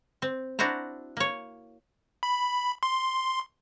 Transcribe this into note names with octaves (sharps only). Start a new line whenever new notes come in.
C4
D4 E4 F#4 C5 A#5
A#3 C#5
B5
C6